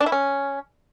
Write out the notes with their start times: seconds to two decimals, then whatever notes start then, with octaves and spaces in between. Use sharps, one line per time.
0.01 D4
0.06 E4
0.12 C#4